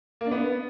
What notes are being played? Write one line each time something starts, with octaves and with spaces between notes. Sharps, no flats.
A#3
D4
B3